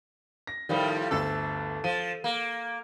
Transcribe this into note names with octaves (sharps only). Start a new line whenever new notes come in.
A#6
A2 D#3 F3 G3
G1 D2 A4
F3 D#7
A#3